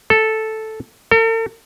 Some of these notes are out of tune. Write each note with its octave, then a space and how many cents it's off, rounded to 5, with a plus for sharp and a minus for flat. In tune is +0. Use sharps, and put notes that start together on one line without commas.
A4 -5
A4 +45